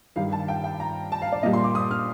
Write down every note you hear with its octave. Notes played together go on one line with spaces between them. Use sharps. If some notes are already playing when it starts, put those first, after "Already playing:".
G2 D#3 G3 F5
A5
G5
G5
A#5
A5
F5
D5
A#2 G3 D#5
C6
D6
D#6
F6